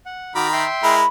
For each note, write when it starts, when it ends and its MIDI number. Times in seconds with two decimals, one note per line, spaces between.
0.06 0.34 78
0.35 0.64 51
0.35 0.47 66
0.35 0.64 82
0.35 0.64 83
0.35 0.47 86
0.53 0.95 76
0.53 0.95 79
0.53 0.95 84
0.83 1.03 56
0.83 1.03 64
0.83 1.03 70
0.83 1.07 83